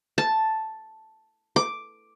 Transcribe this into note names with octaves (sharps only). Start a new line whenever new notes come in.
A5
D6